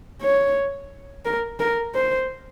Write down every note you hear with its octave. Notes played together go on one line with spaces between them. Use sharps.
C#5
A#4
A#4
C5